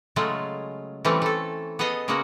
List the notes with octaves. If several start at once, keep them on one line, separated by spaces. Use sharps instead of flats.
C#3 F#3 G#3 A3 F4
E3 G3 A3 C4 C#4
A3 A4
B3 G#4 A4 D#5 F5
C#3 G#3 A#3 C#4 F#4